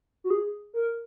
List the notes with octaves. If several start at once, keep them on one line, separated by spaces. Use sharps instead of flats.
F#4
G#4
A#4